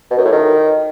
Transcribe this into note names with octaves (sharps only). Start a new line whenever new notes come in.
B2
F#2
A2
D#3